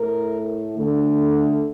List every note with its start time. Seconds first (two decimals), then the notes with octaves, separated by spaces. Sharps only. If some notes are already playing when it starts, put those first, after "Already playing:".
Already playing: A2 A3 A#4
0.76 D3 A3